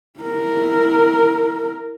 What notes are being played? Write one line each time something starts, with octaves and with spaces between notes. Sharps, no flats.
E4 A#4